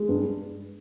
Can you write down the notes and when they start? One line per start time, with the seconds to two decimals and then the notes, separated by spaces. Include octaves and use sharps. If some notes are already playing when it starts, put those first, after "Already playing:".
Already playing: G#3
0.09 G2